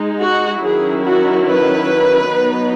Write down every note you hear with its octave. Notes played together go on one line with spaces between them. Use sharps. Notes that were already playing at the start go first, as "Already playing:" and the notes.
Already playing: G#3 D#4
F#4
D#3 F#3 C#4 E4 G#4
F#4
B4
F#3 B3 D#4